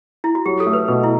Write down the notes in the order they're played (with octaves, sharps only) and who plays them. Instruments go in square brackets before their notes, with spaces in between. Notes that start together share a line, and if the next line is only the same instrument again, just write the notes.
[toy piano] E4
F#4
[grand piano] F#3 [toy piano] G4
[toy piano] A4
[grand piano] A3
[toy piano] B4
[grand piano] B2 [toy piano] B4
[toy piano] E4